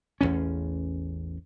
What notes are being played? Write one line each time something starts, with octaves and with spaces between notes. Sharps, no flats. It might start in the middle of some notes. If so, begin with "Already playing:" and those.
A1 E2 G#2 C#4